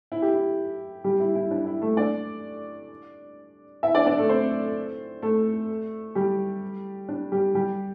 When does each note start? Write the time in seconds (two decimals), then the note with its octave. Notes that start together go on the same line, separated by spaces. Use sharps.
0.12 E4
0.22 G4
0.34 E4
1.04 G3 G4
1.20 E4
1.35 E4
1.51 D4
1.66 E4
1.82 A3 A4
1.97 D4 D5
3.83 E4 E5
3.95 D4 D5
4.06 D4 D5
4.18 A3 A4
4.29 C4 C5
5.22 A3 A4
6.15 G3 G4
7.09 D4
7.32 G3 G4
7.55 G3 G4